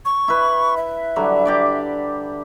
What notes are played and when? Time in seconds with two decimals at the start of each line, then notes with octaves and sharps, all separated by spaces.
0.05 C#6
0.28 E4 B4
0.77 E5
1.16 D3 F#3 G3
1.45 G4 D5 D6